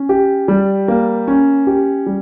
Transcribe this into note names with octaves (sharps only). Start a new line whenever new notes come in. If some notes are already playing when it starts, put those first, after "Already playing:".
Already playing: C#4
G4
G3
A#3
C#4
G4
G3